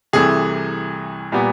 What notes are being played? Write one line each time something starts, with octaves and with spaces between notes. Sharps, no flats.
C2 C3 E3 A3 G#4
A#2 G3 B3